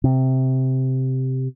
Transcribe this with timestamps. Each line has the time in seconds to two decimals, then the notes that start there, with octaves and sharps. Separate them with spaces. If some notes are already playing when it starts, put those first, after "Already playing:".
0.04 C3